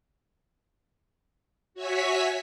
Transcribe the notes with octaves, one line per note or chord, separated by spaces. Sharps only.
F#4 C#5 E5 G#5 B6